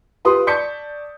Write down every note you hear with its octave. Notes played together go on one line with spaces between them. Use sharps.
F4 G4 B4 C6 D#6
D5 A5 C#6 G6 B6 C#7